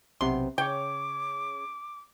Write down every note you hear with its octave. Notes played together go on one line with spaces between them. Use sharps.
B1 C3 B3 C6
C#3 C#5 G5 D6